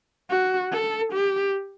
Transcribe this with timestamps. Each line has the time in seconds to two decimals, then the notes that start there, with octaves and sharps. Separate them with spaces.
0.29 F#4
0.71 A4
1.13 G4